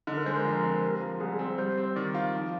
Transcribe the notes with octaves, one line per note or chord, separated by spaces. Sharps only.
D3 D#4
A#4
G#3 C5
A#4
F2
C4
C3
F3
C2 G#4
G#4
C4
G3 C5
C4
D#3 D5
F4
F3